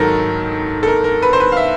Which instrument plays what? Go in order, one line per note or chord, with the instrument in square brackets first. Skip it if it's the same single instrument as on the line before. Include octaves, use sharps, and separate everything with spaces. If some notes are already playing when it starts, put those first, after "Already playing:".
Already playing: [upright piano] G#2 D#3 F#3 A4 A#4
A4
A#4
A#4
B4
C5
B4
F5
E5